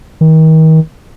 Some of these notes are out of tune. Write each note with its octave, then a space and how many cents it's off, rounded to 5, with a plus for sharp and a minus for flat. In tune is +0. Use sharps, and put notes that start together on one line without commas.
D#3 +35